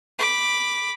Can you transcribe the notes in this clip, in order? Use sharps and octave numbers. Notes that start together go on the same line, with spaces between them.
B5 D6